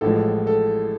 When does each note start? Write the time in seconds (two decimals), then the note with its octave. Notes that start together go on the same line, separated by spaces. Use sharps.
0.01 A1 A2 F3 G#3 A4
0.47 A4